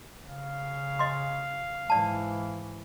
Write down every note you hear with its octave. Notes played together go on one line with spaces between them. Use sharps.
C#3 F5
D#5 C6
G#2 E3 D5 A5